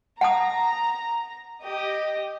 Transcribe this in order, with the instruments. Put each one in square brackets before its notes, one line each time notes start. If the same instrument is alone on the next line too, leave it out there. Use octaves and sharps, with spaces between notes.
[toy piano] F#5 A5 D#6 [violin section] A#5
[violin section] G4 D#5